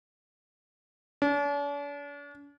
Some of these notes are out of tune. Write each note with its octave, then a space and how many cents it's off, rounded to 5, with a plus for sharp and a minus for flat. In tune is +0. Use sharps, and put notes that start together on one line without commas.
D4 -45